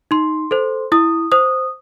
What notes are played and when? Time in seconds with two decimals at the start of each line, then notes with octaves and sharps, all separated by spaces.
0.11 D#4 C6
0.51 A4 C5
0.92 E4 D#6
1.32 C5 D#6